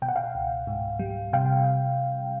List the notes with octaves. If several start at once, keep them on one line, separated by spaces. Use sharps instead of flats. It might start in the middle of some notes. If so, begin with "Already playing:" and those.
B2 G5
F#5
F5 G5
C#2
G#2
G3
C3 F5 G5